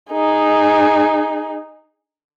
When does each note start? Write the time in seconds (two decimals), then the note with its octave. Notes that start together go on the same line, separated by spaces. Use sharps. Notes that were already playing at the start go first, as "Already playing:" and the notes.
0.12 D#4 G#4